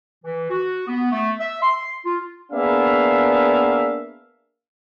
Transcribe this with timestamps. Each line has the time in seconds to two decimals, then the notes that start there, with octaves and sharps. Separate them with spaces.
0.24 E3
0.51 F#4
0.88 B3
1.12 A3
1.40 E5
1.61 C6
2.04 F4
2.52 A#3 B3 D4 G#4 E5 F5